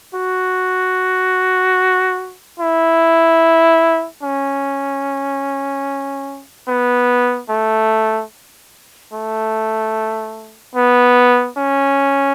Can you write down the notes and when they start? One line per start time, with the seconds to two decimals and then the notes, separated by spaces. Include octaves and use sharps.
0.15 F#4
2.60 E4
4.22 C#4
6.68 B3
7.49 A3
9.13 A3
10.75 B3
11.57 C#4